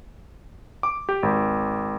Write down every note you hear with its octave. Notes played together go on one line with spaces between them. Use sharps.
D6
G4
G#1